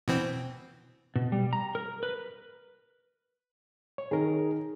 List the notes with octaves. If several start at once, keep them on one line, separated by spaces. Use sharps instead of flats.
B2 E3 C4
B2
G3
A#5
A#4
B4
C#5
D#3 G#4 A#4